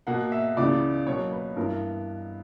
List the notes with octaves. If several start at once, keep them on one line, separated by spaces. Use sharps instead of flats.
B2 A#3 F#5
E5
C#2 C#3 E3 B3 D5
B2 F#3 A#3 C#5
B4
G2 E3 B3 A#4